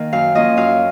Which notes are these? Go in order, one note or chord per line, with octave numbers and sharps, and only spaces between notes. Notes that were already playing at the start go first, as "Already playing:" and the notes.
Already playing: D#3 A#3
F#2 F5
F3 A#3 C#4 F4 D#5
F#2 F5